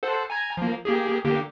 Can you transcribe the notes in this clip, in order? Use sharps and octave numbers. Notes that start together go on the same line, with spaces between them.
A4 C5 F#5
G#5 A#5 G#6
F3 A#3
A#3 G4 G#4
D3 A#3 G4